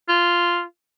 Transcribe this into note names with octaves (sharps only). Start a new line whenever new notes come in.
F4